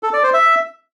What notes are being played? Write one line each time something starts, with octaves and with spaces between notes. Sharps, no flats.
A4
D5
C5
E5